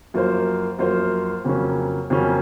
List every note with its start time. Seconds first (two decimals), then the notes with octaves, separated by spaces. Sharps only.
0.14 F#2 F3 A#3 F4 C5
0.79 F#2 F3 A#3 F4 C5
1.45 F2 C#3 F#3 A#3 C#4
2.10 F2 C#3 F#3 A#3 C#4